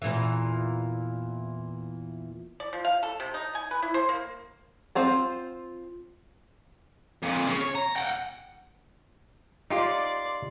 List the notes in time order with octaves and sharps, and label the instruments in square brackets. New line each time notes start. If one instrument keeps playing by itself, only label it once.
[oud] E2 A#2 E3
[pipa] D5
F3
F5
A4
C3
D#4
G#5
B4
E4
C5
A#3
[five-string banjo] C4 F4 C5
[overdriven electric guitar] F2 A#2
C#3
C#5
A#5
F#5 G5
[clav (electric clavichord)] D#4 F4 G4 [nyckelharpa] D5 C6